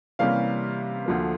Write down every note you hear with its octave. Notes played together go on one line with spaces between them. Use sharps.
C3 E3 G3 A#3 C#4 F5
D2 D3 F3 A#3